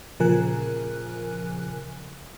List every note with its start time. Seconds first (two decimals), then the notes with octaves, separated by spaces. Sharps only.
0.20 A#2 C#3 F3 A#4 G#5 F#6